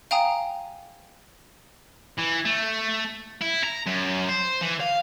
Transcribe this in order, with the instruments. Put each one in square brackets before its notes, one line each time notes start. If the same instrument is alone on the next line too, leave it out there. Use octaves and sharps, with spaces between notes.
[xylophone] F5 G5 G#5 A#5 D#6
[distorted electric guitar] E3
A3
E4
A#5
F#2
C5
E3
F5